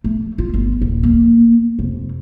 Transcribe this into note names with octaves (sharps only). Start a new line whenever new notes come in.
A3
F4
G1
D#1
A#3
F1